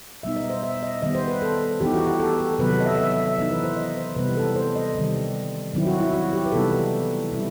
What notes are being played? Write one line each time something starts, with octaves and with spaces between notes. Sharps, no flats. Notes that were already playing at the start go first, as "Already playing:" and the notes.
B2 G3 B3 D#4 E5
D#5
C5
E5
D#5
D#3 G3 B3 D#5
C5
B4
A4
E3 B3 D#4 G4
F#4
G4
A4
A4
C3 D#3 F#3 B3 B4
A4
D#5
E5
E5
E5
E5
E3 B3 D#4 D#5
B4
C5
D#5
C5
C3 E3 G3 B3 B4
A4
C5
D#5
C3 D#3 G3
D#3 F#3 C4 E4
F#4
E4
F#4
G4
B4
C3 E3 G3 B3 D#4 A4
B2 G3 C4 E4